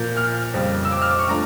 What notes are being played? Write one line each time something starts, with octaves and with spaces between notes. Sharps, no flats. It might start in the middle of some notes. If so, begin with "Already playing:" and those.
Already playing: A#2 F3 A#3 G6
F6
F2 C#3 G3
E6
D6
F6
D6
C#6
F3 A3 D4 A#5